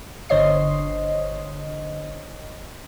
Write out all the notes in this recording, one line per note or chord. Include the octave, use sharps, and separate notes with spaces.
G1 D3 C5 C#5 D#5 C7